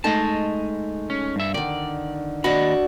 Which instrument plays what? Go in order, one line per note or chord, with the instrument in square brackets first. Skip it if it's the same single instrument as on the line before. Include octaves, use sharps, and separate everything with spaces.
[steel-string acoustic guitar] G#3 A3 D#4 [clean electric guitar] D#5 A5
[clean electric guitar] C#4
G2 E5
[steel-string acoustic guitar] D3 D#3 [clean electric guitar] D5
[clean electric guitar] D#2 D#5 B5 [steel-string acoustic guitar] D4 F#4